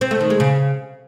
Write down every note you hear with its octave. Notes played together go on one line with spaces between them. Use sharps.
C4
A3
D#3
G#3
C#3